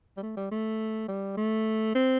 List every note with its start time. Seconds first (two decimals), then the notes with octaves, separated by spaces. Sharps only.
0.17 G3
0.23 A3
0.37 G3
0.51 A3
1.08 G3
1.37 A3
1.95 C4